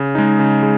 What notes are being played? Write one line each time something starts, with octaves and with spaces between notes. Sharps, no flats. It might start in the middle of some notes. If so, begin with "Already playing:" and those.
Already playing: C#3
G#3 D#4
C#3
G#3